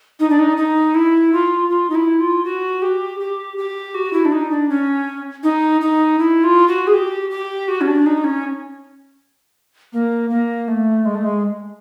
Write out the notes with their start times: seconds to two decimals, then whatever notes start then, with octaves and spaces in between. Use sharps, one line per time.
0.20 D#4
0.30 D4
0.39 D#4
0.57 D#4
0.94 E4
1.33 F4
1.70 F4
1.90 D#4
1.95 E4
2.20 F4
2.44 F#4
2.82 G4
3.20 G4
3.57 G4
3.94 F#4
4.13 E4
4.25 D4
4.32 D#4
4.51 D4
4.69 C#4
5.43 D#4
5.81 D#4
6.19 E4
6.44 F4
6.68 F#4
6.87 G#4
6.94 G4
7.30 G4
7.68 F#4
7.81 C#4
7.87 D4
8.06 D#4
8.24 C#4
9.93 A#3
10.30 A#3
10.68 A3
11.05 G#3
11.15 A3
11.24 G#3